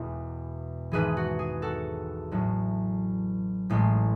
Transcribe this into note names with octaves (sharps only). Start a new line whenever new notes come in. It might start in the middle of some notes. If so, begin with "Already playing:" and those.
Already playing: E1 E2 B2
G#1 G#2 E3 G#4 B4
F#4
G#4
F#4 A4
A1 A2 F#3
A1 A2 G#3